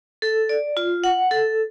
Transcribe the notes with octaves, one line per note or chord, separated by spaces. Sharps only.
A4
D5
F4
F#5
A4